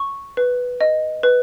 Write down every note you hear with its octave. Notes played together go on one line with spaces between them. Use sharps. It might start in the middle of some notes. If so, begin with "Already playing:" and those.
Already playing: C#6
B4
D#5
B4